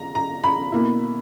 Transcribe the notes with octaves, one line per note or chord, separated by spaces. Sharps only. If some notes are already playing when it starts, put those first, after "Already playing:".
Already playing: A#5
A#5
B5
B2 A#3 E4